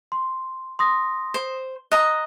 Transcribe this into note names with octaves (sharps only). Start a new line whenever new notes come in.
C6
C6 D#6 A#6
C5
D#5 A#5 F#6